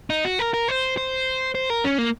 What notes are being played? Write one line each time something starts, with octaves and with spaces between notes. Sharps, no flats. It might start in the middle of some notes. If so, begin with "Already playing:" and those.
D#4
F#4
A#4
A#4
C5
C5
C5
A#4
C#4
A#3